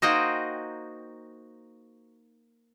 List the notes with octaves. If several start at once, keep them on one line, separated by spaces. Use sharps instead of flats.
A#3 D#4 F#4 C5 D#5 G5